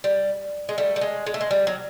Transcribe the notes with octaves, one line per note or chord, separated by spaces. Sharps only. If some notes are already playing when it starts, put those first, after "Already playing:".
G3
G#3
G3 A3
G3
G#3
G#3
A3
G#3
G3
F#3